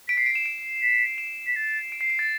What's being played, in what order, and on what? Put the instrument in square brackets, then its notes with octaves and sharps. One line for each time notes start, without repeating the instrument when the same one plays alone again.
[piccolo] B6 [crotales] D7
[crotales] C7
D7
E7
D7
[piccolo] B6
[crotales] E7
[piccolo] B6
A6
[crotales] D7
C7
D7
A6